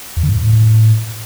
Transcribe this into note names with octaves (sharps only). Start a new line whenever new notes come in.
E2
D3
G#2
E2
A2